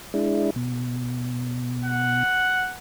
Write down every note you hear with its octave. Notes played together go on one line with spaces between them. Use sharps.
G#3 D4 E4
B2
F#5